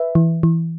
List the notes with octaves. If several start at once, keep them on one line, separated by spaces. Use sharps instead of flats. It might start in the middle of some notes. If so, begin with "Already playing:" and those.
Already playing: B4 E5
E3
E3